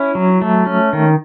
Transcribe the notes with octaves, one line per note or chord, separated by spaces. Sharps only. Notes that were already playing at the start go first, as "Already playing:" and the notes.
Already playing: C#4 E4
F#3
A3
C#4
D#3